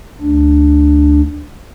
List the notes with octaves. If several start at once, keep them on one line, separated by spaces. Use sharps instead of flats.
D2 D4